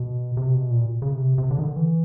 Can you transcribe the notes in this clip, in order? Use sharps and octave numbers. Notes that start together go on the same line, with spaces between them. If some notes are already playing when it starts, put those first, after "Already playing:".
Already playing: B2
C3
B2
A#2
C#3
C3
C3
D3
D#3
D3
E3